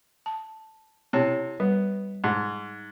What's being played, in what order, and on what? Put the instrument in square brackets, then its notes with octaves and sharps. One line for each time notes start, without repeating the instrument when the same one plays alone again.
[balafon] A5
[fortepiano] C3 [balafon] E4 C#5 A5
[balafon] G3 [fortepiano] B3
[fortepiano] G#2